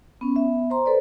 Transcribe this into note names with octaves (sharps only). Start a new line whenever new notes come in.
B3 C#4
B3 E5
C5 A#5 C6
A4 B4 C5 D5